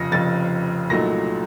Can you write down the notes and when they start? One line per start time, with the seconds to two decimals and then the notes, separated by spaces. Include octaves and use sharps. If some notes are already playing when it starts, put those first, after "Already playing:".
Already playing: F1 F2 C#3 F3 A#6 C#7
0.12 F1 F2 C#3 F3 A6
0.90 C2 A#2 F#3 A3 D#4 A#6